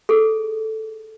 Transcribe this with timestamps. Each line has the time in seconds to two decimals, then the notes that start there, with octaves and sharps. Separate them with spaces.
0.09 G#4 A4